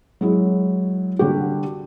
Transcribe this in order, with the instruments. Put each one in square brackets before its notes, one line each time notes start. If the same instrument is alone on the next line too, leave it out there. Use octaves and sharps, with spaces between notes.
[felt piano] F#3 G#3 E4
D3 G3 F#4 G4